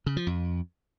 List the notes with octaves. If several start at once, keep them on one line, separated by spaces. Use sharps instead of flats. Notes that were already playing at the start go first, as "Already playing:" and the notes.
C#3
F3
F2